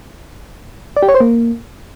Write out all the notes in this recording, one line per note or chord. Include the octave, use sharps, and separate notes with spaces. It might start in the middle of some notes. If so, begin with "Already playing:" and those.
D5
G4
C#5
C5
A#3